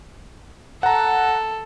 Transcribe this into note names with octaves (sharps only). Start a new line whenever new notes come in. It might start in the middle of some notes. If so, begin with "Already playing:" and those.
A4 F#5 A#5